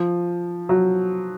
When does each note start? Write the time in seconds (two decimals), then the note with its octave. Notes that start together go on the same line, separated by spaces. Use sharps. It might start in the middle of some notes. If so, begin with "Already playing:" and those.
Already playing: F3
0.69 F#3